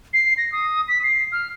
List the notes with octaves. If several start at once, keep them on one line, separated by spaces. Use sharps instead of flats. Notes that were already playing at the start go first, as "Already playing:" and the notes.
C7
A#6
D#6
B6
C7
F6